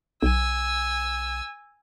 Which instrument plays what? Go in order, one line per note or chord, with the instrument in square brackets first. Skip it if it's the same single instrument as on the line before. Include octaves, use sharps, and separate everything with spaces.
[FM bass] B1 [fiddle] G#5 E6